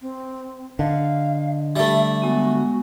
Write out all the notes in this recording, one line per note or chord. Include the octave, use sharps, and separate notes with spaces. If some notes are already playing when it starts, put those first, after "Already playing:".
C4
D3 D#5 F5
G3 A3 E5
G#3 B3 F#4